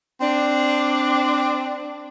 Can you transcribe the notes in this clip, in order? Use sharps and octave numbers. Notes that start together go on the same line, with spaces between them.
C4 D4